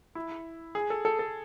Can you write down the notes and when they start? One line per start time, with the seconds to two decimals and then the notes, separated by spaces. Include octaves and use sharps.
0.15 E4
0.75 G#4
0.90 A4
1.05 A4
1.19 A4